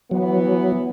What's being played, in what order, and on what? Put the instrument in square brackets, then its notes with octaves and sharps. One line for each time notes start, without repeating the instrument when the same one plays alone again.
[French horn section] E3 B3 [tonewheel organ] F#3